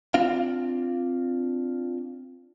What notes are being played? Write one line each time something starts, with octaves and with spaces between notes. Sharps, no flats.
C4 D4 F4 F5